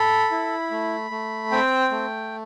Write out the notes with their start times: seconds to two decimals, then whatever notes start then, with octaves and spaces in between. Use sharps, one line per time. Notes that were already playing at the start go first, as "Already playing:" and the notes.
Already playing: A4 B5
0.31 E4
0.71 A3
1.11 A3
1.51 C4 G5
1.91 A3